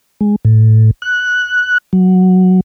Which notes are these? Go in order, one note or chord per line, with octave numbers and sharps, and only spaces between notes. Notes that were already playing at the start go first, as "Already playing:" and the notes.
G#3
A2
F#6
F#3